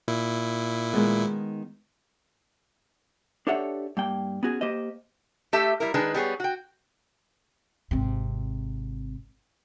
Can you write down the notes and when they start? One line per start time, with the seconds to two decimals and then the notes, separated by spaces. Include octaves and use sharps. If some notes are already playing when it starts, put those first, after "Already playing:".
0.08 A#2 E4
0.93 D#3 G#3 B3
3.47 D4 G4 A4 C#5 E5 F#5
3.97 G2 A#3 G5
4.43 B3 C#4 F#4 G#4
4.61 A#3 G4 C5 D#5
5.53 A3 G4 A4 E5
5.80 G3 E4 A#4
5.94 D#3 G#3 D4 G#4 B4
6.14 G3 B3 G#4 C#5
6.40 F#4 G5
7.91 G#1 C3